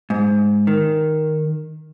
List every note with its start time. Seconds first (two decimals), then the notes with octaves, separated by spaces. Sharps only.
0.10 G#2
0.67 D#3